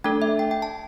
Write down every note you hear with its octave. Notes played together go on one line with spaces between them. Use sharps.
A3 D4 A4 G5
E5
G5
G5
A5